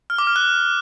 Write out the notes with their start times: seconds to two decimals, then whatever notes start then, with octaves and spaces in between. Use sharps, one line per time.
0.10 F6
0.18 D6
0.27 F6
0.36 F#6